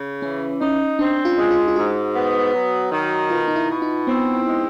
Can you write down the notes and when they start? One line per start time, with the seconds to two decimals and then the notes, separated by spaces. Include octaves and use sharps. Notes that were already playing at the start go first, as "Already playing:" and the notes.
Already playing: C#3
0.22 E3 C#4
0.60 C#4 D#4
0.99 C4 D4
1.25 F4
1.38 G#3
1.51 F4
1.68 F4
1.76 G#2 F#4
2.15 B3
2.53 F#3
2.92 D#3
3.30 B2 F4
3.48 D#4
3.56 E4
3.69 B2
3.82 D#4
4.07 B3 C4
4.47 G#3